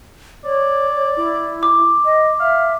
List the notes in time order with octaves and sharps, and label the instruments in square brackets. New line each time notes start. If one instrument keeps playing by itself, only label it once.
[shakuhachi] C#5 [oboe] D5
[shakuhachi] E4
[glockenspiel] D6
[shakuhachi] D#5
[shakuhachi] E5 [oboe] F5